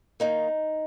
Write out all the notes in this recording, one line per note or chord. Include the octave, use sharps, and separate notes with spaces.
D#3 A#3 D#4